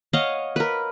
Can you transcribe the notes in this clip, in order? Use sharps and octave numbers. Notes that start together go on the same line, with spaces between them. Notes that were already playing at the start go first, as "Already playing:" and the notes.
C#5 D#5 F5 F#5
A#4 B4